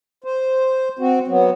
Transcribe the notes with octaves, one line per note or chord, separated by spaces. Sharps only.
C5
C4 F#4
F#3 B3